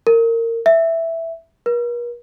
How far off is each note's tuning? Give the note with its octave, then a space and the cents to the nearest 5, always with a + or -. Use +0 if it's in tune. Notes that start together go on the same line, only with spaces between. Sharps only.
A#4 -25
E5 +0
A#4 +45